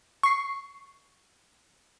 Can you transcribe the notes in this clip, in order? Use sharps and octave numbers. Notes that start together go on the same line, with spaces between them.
C#6 C7